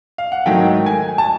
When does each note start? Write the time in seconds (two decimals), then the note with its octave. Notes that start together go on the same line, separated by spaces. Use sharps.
0.18 F5
0.32 F#5
0.46 G#2 D#3 F#3 A3 G5
0.86 G#5
1.18 A5